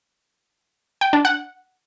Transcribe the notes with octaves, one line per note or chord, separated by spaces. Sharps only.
G5
D4
F#5